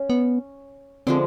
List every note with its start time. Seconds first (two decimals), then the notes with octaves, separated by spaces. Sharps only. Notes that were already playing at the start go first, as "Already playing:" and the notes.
Already playing: C#4
0.10 B3
1.07 D3 F3 G#3 C4